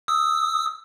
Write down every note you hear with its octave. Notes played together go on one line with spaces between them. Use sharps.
D#6 E6